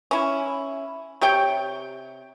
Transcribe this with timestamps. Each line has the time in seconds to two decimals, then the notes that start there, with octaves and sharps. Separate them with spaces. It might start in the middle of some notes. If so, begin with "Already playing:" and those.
0.11 C#4 E4
1.21 C3 G4 C#5 G5